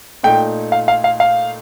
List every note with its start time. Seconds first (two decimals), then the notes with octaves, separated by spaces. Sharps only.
0.23 A#2 A3 D#4 G5
0.72 F5
0.88 F5
1.04 F5
1.20 F5